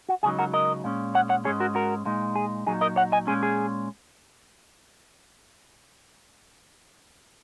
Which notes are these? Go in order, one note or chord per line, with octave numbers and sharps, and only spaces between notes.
F#4
C#2 C#3 F#3 D#4 G#4
F#4 A#4
A#4 D#5
A#2 G#3 C#4
C#5 F#5
C#5 F#5
G#2 G#3 C#4 G#4 C#5
F#4 A#4
F#4 A#4
A#2 G#3 D#4
G#4
A#2 F#3 D#4 G#4
A#4 D#5
C#5 F#5
D#5 G#5
A#2 G#3 C#4 G#4
G#4